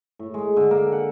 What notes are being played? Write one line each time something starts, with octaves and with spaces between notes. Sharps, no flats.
A2
G#3
D3
A#3
F#5